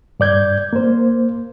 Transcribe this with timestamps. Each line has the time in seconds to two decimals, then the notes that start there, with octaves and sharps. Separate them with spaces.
0.20 G2 D5 G6 G#6
0.73 A#3 C5